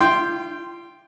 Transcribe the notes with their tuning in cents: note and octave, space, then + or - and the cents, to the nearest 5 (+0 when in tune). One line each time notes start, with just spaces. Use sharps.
F4 -35 G5 +0 C6 +0